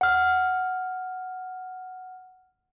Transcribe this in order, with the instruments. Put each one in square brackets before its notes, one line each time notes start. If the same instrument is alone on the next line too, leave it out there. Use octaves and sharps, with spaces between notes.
[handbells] F#5 F6